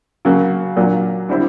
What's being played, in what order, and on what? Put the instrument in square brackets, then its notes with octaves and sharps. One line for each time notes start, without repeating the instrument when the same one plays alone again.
[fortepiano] C#3 F#3 A#3
A#2 F#3 A#3 D4
D3 G3 C4 E4